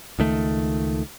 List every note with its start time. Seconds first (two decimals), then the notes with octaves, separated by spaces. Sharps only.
0.19 C#2 D#3 A3